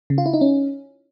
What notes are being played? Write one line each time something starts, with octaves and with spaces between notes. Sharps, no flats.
C#3
F4
E4
D#4
C#4